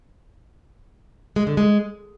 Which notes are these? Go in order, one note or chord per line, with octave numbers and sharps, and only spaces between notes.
G#3
D3
G#3